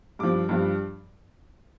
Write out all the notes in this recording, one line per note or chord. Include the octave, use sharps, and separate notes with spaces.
G2 F3 D6
G2 F3